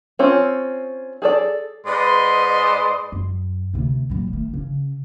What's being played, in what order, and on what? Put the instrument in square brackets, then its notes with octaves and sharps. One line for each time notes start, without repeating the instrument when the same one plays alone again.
[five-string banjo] C4 C#4 F4
G#4 A4 D5
[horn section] G#2 B4 D5 D#5 C6
[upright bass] F#2
D2 C3
A#2 F#3
D#3 A3
C#3 C#4